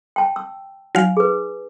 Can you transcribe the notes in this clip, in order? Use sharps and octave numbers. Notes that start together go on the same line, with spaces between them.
G5 A5
E6
F#3 D#4 F5 G#5
G#4 B4